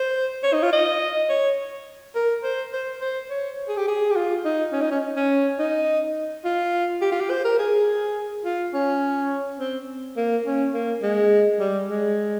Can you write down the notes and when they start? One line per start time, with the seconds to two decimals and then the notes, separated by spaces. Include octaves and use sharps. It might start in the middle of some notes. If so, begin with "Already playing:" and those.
Already playing: C5
0.44 C#5
0.53 D#4
0.63 F4
0.73 D#5
1.29 C#5
2.15 A#4
2.44 C5
2.73 C5
3.01 C5
3.30 C#5
3.68 G#4
3.77 G4
3.88 G#4
4.10 G4
4.16 F4
4.45 D#4
4.73 C#4
4.81 D#4
4.91 C#4
5.16 C#4
5.59 D#4
6.45 F4
7.01 G4
7.12 F4
7.21 G4
7.30 C5
7.45 A#4
7.59 G#4
8.45 F4
8.74 C#4
9.60 C4
10.17 A#3
10.46 C#4
10.74 A#3
11.03 G#3
11.60 G3
11.88 G#3